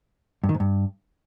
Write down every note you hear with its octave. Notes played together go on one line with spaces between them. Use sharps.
G2
D#3
G#2
G2